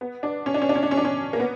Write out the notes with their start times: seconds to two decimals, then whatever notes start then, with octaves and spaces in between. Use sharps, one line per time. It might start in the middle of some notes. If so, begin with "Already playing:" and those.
0.01 B3
0.23 D4
0.46 C#4
0.54 D4
0.62 C#4
0.69 D4
0.75 C#4
0.83 D4
0.91 C#4
0.97 D4
1.05 C#4
1.33 A#3
1.40 B3